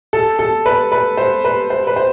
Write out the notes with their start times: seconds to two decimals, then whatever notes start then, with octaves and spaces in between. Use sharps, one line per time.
0.13 A4
0.39 A4
0.66 B4
0.92 B4
1.17 C5
1.45 B4
1.70 C5
1.87 B4
1.96 C5